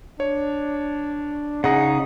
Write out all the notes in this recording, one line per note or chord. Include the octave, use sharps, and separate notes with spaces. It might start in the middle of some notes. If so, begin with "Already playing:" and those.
D4 C#5
C#3 D#4 G#4 F#5